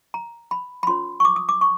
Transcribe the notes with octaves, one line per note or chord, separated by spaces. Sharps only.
A#5
B5
B5
C#4 F4 A#4 C#5 C6
C#6
D6
D#6
D6
C#6